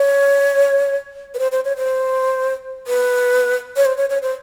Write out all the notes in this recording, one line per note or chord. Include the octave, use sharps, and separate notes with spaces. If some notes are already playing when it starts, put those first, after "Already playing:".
Already playing: C#5
B4
C5
C5
C#5
C5
B4
C#5
C5
C#5
C#5
C5